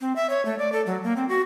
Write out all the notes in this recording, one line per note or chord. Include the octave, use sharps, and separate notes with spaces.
C4
E5
C#5
A3
D5
A4
F#3
A#3
C4
F#4